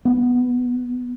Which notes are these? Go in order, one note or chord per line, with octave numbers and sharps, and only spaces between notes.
B3